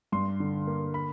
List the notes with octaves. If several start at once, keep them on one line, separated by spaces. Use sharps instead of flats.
G2 C6
D3
A#3
B5